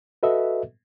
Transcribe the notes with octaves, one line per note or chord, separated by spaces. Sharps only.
F#4 A4 B4 D#5 E5